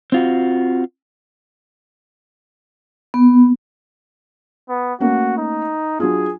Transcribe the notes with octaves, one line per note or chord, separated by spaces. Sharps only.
C4 F4 F#4
B3
B3
A3 A#3 C#4 F#4
D#4
F#3 D4 F4 G#4